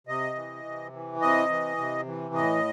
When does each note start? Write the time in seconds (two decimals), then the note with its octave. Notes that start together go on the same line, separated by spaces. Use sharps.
0.07 C3 D#5
0.35 E3
0.64 C3
0.92 E3
1.21 C3 D#5
1.49 E3
1.77 C3
2.06 E3
2.34 A2 D#5